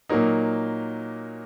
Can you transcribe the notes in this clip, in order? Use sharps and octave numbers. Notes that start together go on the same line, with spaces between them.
A#2 F#3 A#3 D#4